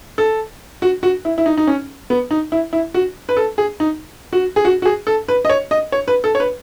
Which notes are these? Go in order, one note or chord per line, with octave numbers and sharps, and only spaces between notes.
A4
F#4
F#4
E4
E4
D#4
D#4
C#4
B3
D#4
E4
E4
F#4
B4
A4
G#4
D#4
F#4
G#4
F#4
F#4
G#4
A4
B4
D#5
C#5
D#5
C#5
B4
A4
C#5
B4